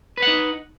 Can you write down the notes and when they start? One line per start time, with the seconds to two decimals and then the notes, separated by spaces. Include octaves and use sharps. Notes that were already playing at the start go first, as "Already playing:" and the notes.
0.17 B4
0.22 F#5
0.27 D#4